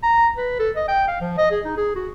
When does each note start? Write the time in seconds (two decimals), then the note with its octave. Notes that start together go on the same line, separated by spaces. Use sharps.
0.03 A#5
0.37 B4
0.59 A4
0.76 D#5
0.88 G5
1.08 F5
1.21 F3
1.37 D#5
1.51 G#4
1.65 D#4
1.77 G#4
1.95 F#4